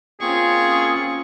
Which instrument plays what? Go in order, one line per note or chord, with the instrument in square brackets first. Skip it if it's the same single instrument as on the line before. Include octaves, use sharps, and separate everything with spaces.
[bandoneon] A#3 C4 F4 [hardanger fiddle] C#4 C#6 [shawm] G#4